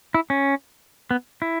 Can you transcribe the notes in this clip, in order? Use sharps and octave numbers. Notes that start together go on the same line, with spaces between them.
E4
C#4
B3
E4